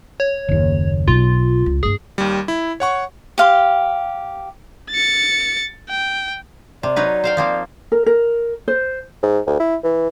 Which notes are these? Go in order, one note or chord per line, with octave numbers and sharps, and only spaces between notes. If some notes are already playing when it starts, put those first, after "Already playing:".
C#5
F#1 D#2
B1 B2 F4
C#2
G2 A3 G#4
D#2 G3
E4
C#5 F#5 C#6
G4 F5 C6
A6 C#7
G5
C3 D5
F#3 D#4 B4
C5 F5 G5
F3 A#3 C4
A#4
A#4
C5
G#2
D2
E4
E3